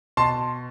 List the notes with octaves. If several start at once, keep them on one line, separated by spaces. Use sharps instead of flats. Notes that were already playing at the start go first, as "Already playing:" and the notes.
B2 A5 C6